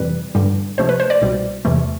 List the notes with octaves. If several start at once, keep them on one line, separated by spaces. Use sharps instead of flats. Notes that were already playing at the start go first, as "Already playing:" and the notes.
Already playing: F2 C3 E3 G3 B4
G2 D3 G3
D2 C3 F3 A3 C5
B4
C5
D5
C2 B2 G3
E2 C3 E3 A3